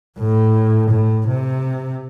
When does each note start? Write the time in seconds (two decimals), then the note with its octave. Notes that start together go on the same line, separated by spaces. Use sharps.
0.18 A2
0.90 A2
1.28 C3